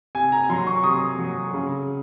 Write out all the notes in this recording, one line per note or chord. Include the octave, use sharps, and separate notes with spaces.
C3 G#5
A#5
F#3 C6
C#6
C3 D#6
F#3
C#3